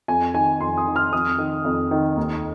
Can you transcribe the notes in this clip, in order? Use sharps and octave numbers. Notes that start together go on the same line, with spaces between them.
F2 G#5
D#3 G#5
F2 C6
D#6
D#3
F6
F2 D#6
D#3
F2
D#3
D#2